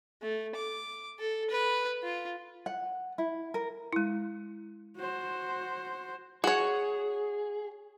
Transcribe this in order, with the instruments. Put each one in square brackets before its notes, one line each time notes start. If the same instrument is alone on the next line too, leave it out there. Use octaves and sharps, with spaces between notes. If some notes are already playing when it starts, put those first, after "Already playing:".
[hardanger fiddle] A3
D6
A4
B4
F4
[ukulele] F#5
E4
A#4
[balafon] G#3 E4
[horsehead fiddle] F#4 C5
[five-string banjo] F#4 C#5 [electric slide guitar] G#4